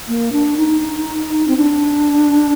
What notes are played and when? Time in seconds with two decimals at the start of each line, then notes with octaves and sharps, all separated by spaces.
0.08 A#3
0.32 D4
0.57 D#4
1.48 C4
1.57 D4